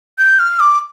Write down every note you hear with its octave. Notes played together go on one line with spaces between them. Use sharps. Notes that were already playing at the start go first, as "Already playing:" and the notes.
G6
F6
D6